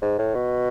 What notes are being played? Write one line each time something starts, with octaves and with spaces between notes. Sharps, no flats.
G#2
A2
B2